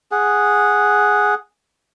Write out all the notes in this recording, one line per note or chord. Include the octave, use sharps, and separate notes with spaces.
G#4 F#5